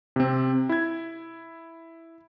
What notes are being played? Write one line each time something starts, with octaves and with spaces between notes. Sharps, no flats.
C3 C4
E4 G#6